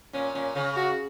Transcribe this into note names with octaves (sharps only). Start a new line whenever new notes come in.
A#2 C#4
A#2 C#4
C#3 C#4
F#4